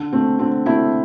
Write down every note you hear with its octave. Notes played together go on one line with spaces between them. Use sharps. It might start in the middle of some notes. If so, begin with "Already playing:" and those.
Already playing: D3
A3 C4
D3 C4
A3 C4 E4